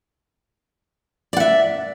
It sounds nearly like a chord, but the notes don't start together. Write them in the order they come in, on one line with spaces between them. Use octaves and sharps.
D5 F#5 E5